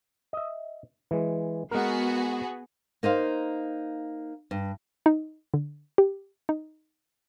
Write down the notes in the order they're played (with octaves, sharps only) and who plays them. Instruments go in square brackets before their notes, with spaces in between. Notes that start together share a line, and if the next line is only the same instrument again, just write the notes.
[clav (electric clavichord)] D#5 E5
E3 G#3
[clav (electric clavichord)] G#3 A#4 [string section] B3 F#4 G#4
[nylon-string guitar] A#3 D#4 C5 F5
G2
[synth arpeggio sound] D#4
D3
G4
D#4